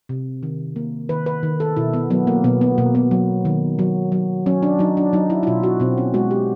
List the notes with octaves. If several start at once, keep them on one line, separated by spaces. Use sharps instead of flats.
C3
D#3
A#3
D#3 B4
B4
D#3
A4
B2 E4
B3
F#3 B3
A#3
B2 B3
B3
B2 A#3
B3
F#3
D#3
F#3
F#3
F#3 C#4
D4
F#3 D#4
D4
F#3 D#4
E4
E4
B2 F4
F#4
B2 C4
C#4
G#3 F#4
G4